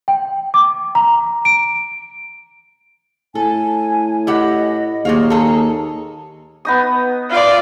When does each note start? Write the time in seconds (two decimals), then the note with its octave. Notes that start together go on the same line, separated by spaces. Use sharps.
0.08 G5
0.54 D6
0.95 A#5
1.45 D7
3.35 A2 A4 G#5
4.27 E4 G4 D#5 F#5
5.05 D#2 A#2 F#3 G#4 F5
5.30 G#4 A4 A#5
6.65 B3 D#4 D#6
7.30 F4 D5